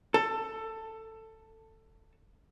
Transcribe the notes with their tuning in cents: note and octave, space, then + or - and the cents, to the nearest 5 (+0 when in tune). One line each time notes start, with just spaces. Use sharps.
A4 +15